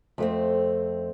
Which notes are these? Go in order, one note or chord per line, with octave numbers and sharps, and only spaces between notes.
F2 A3 C4